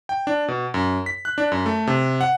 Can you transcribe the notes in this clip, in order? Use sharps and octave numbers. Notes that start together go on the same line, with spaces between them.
G5
D4
B2
F#2
B6
F#6
D4
F#2
A3
C3
F#5